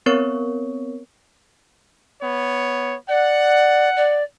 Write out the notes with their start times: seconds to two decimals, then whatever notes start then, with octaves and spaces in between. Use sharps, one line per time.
0.06 B3 C4 A#4 C#5 C#6
2.21 B3 C#5
3.09 D5 F#5
3.96 D5